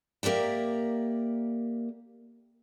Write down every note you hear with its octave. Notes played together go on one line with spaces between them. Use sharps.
A#3 G4 A#4 D5 E5